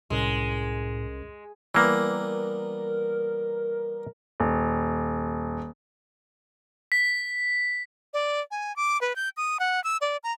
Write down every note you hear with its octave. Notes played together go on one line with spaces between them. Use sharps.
C2 A2 G#3 C#4 A#4
E3 G3 A#3 B3 A#4
D#1
B6
D5
G#5
D6
B4
G6
D#6
F#5
E6
D5
A#5